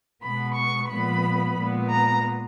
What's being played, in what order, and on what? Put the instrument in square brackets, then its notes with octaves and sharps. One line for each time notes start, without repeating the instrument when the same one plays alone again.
[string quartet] B2 G#3 B3 B5
C#6
A#2 F3 G#3 B3 B5
A#2 G#3 B3
A#5